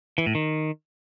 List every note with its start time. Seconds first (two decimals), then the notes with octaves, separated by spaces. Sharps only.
0.18 E3
0.26 A2
0.35 D#3